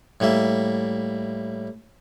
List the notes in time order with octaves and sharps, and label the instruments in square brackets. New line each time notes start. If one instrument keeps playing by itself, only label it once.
[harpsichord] A2 G3 A#3 E5